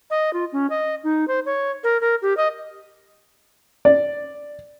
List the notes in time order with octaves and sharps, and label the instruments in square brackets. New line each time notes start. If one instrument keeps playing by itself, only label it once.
[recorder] D#5
F4
C#4
D#5
D#4
C5
C#5
A#4
A#4
G4
D#5
[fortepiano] D5